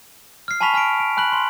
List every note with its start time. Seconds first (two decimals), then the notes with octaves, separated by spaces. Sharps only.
0.48 F6 C7
0.61 G#5 A5 B5 C#6 B6 F7
0.74 G#5 F6 B6 D7
1.00 D7
1.17 G#5 B5 F#6 B6 F#7
1.32 C6